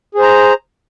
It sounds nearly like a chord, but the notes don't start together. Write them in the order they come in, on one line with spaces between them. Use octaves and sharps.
G#4 C5 A#5